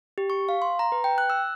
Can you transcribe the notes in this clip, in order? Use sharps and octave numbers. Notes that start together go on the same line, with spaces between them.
G4
C#6
F5
C6
A#5
B4
G5
F#6
E6